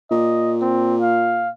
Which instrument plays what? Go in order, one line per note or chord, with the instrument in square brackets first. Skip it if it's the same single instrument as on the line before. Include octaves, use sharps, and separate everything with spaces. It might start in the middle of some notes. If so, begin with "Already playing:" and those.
[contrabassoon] A#2 [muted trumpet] D#5
[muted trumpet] C4
F5